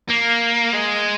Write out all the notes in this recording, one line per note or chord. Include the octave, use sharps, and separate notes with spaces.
A#3
G#3